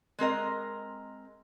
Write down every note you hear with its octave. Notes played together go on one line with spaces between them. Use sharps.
G#3 C4 A#4 D#5